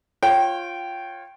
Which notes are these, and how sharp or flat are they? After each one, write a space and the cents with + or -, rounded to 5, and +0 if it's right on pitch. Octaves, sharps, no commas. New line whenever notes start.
F4 +0 C#5 -30 G5 -15